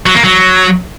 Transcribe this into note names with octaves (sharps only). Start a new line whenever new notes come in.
F#3
A#3
F#3